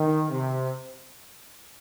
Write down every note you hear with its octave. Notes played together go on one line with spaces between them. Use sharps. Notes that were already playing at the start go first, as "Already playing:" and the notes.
Already playing: D#3
C3